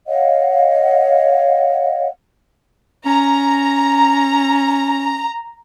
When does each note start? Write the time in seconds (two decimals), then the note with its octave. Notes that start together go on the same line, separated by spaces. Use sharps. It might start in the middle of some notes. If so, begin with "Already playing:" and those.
0.07 C#5 D#5 F5 F#5
3.06 C#4 A#5